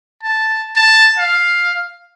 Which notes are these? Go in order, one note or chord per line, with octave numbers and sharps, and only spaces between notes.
A5
A5
F5